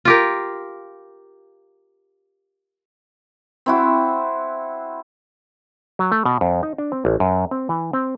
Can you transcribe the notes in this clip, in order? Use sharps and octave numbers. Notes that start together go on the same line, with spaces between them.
F4 G4 A#4
C4 E4 F#4
F#3
A3
B2
F2
D#4
D4
C4
A1
F#2
C4
E3
C4